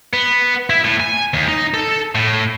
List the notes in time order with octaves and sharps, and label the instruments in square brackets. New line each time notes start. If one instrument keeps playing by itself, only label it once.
[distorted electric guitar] B3
E4
A2
G#5
D#2
D#4
A4
A2